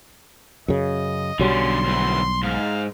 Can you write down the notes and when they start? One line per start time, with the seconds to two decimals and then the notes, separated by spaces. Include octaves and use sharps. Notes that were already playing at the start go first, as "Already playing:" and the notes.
0.68 F#2 C#3 D#5
1.39 B1 D3 F#3 G3 C#4 C6
1.84 D2 E3
2.43 G#2 F5